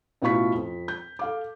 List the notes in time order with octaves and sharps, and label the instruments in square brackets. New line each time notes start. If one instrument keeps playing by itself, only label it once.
[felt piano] A1 B2 E4 F4 C#6 B6
F2
G6
A4 F5 D6